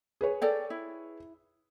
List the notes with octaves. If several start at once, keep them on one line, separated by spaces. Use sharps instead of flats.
G#4 B4 C#5
A4 D5 G5
E4